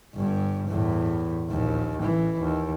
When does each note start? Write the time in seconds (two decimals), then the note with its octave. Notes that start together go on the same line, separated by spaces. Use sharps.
0.14 G1 G2
0.68 E2 A2
1.49 A#1 D#2
1.99 A1 E3
2.39 D#2